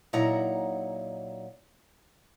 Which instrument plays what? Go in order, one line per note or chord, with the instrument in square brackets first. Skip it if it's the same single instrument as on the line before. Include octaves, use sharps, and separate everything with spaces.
[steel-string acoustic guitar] A#2 F#3 D#4 E4 F#5 A#5